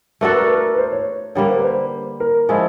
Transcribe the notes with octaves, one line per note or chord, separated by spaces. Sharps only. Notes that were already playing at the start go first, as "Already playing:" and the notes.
A3 D4 F#4 A4 A#4
B4
A#4
B4
A#4
B4
C5
C#5
D3 G3 A#3 C#5
C5
B4
C5
A#4
F3 G#3 C#4 E4